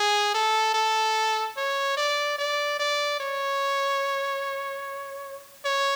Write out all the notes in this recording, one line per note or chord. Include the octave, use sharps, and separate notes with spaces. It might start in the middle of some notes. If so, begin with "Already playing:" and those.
Already playing: G#4
A4
A4
C#5
D5
D5
D5
C#5
C#5